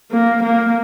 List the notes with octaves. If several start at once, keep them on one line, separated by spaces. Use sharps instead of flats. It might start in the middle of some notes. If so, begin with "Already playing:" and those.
A#3
A#3